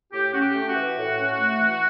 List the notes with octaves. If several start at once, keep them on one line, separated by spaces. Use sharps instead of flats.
A2 G4
C#4 F#4
G4
A3
F#4
E3
A2
C#4
A3
E3